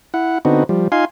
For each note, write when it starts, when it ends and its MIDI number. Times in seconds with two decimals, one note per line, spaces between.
0.14 0.38 64
0.14 0.38 78
0.45 0.64 50
0.45 0.64 59
0.45 0.64 60
0.45 0.64 63
0.45 0.64 66
0.69 0.88 53
0.69 0.88 55
0.92 1.05 63
0.92 1.05 65
0.92 1.05 77
0.92 1.05 80
0.92 1.05 84